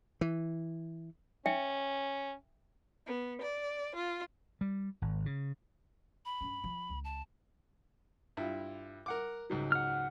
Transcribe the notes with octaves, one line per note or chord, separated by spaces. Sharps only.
E3
C#4 E5 G5 G#5
B3
D5
F4
G3
G#1
C#3
B5
G2 C#4
F3
C#2
A5
G2 E4 F4
A#4 F#5 D6
C#2 G#2 F#3
F#5 F6